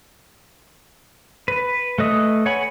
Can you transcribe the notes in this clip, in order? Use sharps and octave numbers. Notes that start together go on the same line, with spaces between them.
B4
A3 B4 D#5 D#6
C#5 F#5 G#5 B5